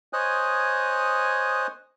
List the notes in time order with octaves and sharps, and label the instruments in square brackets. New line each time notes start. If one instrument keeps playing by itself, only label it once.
[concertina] C5 C#5 D#5 G#5 D#6 F#6